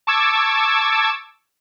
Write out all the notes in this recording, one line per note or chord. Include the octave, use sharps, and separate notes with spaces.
A5 C#6 D6 E6 G#6